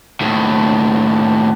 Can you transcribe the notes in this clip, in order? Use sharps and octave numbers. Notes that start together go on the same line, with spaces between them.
D#2 A2